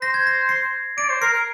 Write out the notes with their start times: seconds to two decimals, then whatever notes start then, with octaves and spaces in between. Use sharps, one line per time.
0.02 C5 A#6
0.14 G#6
0.27 A#6
0.49 C7
0.97 D5 D7
1.09 C5
1.21 A#4 C7
1.33 A#4